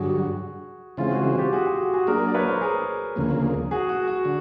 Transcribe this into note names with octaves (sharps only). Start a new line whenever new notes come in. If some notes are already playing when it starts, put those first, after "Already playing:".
Already playing: G2 D3 F#3 F#4 G#4
C#3 E3 G#3 C4 F4
F#4
F#4
F4 G4
F#4 G#4
F#4 G#4
F#4
F#4 G#4
F#3 A#3 D4 G#4 A#4
D5
B4 C#5
A#4 C5
G#4 A#4
D2 C#3 F3 A#3
F#4 G#4
F#4
F#4
D3